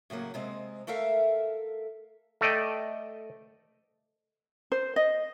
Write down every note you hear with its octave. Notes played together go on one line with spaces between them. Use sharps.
A2 C#3 F#3 A#3
C3 G#3 C4 D#5
A3 A4 A#4 E5 F5
A3 A4 D5 D#5 G5
C5
D#5